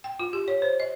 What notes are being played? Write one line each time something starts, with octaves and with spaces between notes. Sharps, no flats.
G5
F4
G4
C#5
C5
D#5